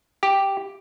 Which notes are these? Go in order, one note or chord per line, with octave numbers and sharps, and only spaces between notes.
G4